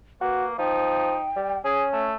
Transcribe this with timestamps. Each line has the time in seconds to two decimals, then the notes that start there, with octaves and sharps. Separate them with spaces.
0.21 A#3 F#4 B4
0.58 F3 D#4 G5
1.36 G3
1.65 C#4 G#4 G#5
1.93 A3